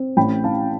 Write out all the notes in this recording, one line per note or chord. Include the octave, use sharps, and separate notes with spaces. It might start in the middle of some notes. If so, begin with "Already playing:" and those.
Already playing: C4
A1 G5 B5
E3 F5 A5